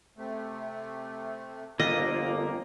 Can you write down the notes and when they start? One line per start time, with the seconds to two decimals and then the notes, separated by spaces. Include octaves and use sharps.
0.17 C3 A3
1.80 G1 F2 D3 A#3 F4 G4 D#5